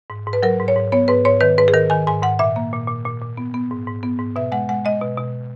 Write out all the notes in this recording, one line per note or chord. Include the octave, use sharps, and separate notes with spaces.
G#2
G#2
B4
F#3 A#4
G#2
C#5
G#2
B3 C#5
G#2 B4
G#2 C#5
D#3 B4
G#2 B4
G#4
D#3 A#4
D#3 G#5
G#2 G#5
G#2 F#5
A#2 E5
A#3
A#2
A#2
A#2
A#2
B3
B3
G#2
G#2
B3
G#2
B2 E5
G#3 F#5
G#3 F#5
G#3 D#5
B2
B2